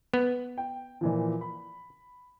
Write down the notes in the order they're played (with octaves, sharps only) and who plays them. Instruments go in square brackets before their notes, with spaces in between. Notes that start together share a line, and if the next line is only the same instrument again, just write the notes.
[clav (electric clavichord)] B3
[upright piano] G5
A#2 E3 F3
B5